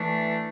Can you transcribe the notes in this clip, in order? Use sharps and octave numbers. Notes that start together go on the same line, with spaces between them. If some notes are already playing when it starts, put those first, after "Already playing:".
Already playing: E3 A3 D4